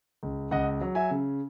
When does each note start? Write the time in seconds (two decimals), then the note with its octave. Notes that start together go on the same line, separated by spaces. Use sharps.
0.23 C#2
0.51 C#2 D#5 F#5
0.81 F#3
0.95 E5 G#5
1.11 C#3